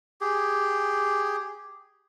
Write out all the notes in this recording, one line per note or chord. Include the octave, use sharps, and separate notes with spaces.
G4 G#4